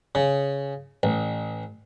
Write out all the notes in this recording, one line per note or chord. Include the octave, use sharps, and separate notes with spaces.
C#3
A1